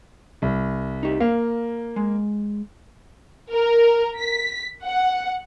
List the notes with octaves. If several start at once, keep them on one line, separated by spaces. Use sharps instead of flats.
C2
D#4 G4
A#3 F5
G#3
A#4
B6
F#5